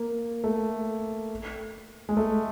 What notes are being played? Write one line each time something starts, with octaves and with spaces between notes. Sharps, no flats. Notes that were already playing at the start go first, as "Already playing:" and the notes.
Already playing: A#3
A3
G#3
A3